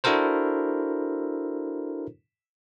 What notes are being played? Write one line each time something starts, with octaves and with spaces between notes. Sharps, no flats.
D4 E4 F#4 A4 A#4 C5